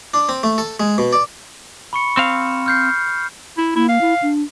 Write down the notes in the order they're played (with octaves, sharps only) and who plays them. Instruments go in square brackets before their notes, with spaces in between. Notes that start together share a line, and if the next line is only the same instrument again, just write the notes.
[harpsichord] D4
C4
A3
A4
G#3
B2
D5
[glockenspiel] B5 C#6 C#7
[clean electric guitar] C4 F5
[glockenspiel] F6 G6 C7
[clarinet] E4
[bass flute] A#3 [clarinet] E4
[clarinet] F5
[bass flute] E4
D4